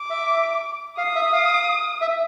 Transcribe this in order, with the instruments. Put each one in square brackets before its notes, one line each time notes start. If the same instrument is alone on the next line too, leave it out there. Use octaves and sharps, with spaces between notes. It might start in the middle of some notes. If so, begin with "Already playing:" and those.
Already playing: [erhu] D6
[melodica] E5
[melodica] F5 [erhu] D#6
[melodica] E5
F5
E5